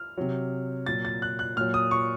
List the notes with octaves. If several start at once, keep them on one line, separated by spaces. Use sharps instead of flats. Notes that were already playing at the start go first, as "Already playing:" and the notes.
Already playing: F6
C3 F#3
A#2 F#3 A6
A6
F#6
F#6
A#2 F#3 F6
D#6
C#6